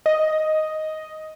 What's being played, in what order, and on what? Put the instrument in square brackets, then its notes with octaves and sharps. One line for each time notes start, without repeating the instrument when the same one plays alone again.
[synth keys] D#5